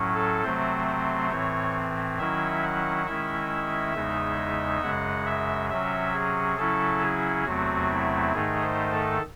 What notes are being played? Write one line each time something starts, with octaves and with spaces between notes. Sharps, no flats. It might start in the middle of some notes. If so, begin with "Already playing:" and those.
Already playing: A2 F#3 C#4
A4
C3 F#3 A3 C4 C5
C5
A2 E3 C4 C#5
D#3 F#3 C#4 E4 E5
F#5
D#3 G#3 C#4 E4 E5
E2 C#3 G#3 D#4
F#2 C#3 G#3 F#5
E5
C3 F#3 C#4 E5
G#4
C#3 F#3 C#4 E4 A4
G#4
E2 C3 F#3 A3 C4 F#4
E4
G#2 D#3 A3 D#4 G#4
C5
A4